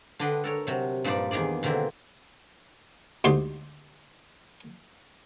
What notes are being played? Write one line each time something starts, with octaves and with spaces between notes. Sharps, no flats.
D3 D4 B4 D#5 G5 C6
A4 A#4 C#5
C3 F#3
G2 A#2 F3 D#4 D5 B5
E2 D#3 A#3 G#4 D5
B2 D3 D#3 A#3 C4
D2 G#2 G4 C6